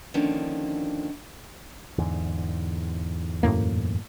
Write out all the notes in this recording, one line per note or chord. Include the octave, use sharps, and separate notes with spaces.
D3 D#3 F3 A#3 C#4 D4
E2 G#2 D3
F#2 A2 A#3